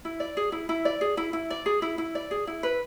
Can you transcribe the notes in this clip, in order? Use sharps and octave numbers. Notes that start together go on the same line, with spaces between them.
E4
D5
G#4
E4
E4
D5
G#4
E4
E4
D5
G#4
E4
E4
D5
G#4
E4
B4